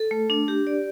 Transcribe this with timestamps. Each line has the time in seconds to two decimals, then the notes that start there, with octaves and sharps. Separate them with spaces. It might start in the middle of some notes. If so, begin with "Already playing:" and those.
Already playing: A4
0.11 A3
0.30 D4
0.48 G4
0.67 D5